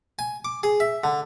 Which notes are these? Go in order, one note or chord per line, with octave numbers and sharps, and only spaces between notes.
G#5
D6
G#4
E5
D3